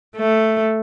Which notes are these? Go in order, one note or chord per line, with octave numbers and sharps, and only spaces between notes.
A3